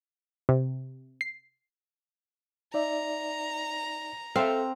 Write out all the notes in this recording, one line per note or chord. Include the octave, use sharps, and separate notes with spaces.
C3
C7
D#4 D5 E5 A#5
C4 A4 E5 F5